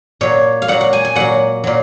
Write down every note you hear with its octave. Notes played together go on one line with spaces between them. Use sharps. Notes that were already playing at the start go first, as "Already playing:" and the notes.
A#2 F#3 C#5
F5
A#2 F#3 F#5
F#5
G#5
G#5
A#2 F#3 F#5
A#2 F#3